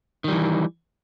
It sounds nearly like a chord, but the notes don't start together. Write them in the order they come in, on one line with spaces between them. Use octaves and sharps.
D#3 G3 E3